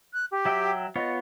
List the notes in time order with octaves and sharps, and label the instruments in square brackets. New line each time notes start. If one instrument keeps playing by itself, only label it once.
[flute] F#6
G4
[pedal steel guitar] F#3 E5 G5
[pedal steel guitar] B3 F4 C#5 [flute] D#5